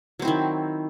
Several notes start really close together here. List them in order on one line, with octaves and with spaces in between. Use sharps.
F#3 C4 E4 D#3